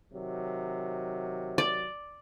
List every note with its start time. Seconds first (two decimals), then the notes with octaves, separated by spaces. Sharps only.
0.13 C3 D#3 F#3
1.58 D5